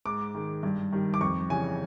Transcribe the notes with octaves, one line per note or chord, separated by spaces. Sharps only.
G#2 D6
D#3 G#3
G2
D#3 G3
D6
F2 C#6
C#3 E3 G3 G#5